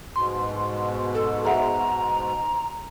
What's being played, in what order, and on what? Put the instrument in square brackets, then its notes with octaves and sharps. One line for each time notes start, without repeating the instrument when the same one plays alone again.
[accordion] G#2 B2 [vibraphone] C6
[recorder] A4
[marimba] G#4 E5 F#5 [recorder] A#5